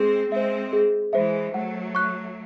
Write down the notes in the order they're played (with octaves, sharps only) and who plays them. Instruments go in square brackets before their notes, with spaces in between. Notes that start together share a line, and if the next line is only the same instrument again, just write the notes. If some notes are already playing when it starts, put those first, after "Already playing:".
Already playing: [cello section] G#3 C4 [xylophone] G#4
[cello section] G#3 C4 [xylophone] C5 E5
[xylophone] G#4
[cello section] E3 G#3 [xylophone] C5 E5
[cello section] F#3 A3 [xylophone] F#5
[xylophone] C#6 F#6